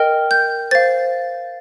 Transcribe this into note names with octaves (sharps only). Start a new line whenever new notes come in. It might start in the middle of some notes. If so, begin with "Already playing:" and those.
Already playing: A#4 D#5 G5 F6
G6
C5 F5 A6